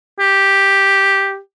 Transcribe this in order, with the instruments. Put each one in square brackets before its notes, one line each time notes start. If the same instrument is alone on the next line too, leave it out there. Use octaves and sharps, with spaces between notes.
[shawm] G4